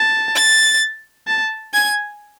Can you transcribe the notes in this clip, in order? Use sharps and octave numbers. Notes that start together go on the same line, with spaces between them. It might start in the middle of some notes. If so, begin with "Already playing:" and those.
Already playing: A5
A6
A5
G#5 G#6